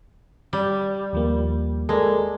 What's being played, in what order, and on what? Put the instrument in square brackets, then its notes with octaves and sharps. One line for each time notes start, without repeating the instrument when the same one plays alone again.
[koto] G3
[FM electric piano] D#2 F3 A#3
[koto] G#3 [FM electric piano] A4 A#4 D5